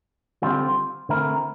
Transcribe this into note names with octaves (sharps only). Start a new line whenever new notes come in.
D3 G3 C4 F4 C5
D3 A3 C4 E4 A#4